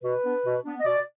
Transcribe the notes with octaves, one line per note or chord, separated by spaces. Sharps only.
B2 B4
B3 D4
B2
B3 D4
D#5
B2 D5